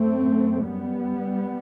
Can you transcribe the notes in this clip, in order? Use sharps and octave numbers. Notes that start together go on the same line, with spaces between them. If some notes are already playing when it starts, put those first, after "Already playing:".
Already playing: F#2 A3 C4
G3 B3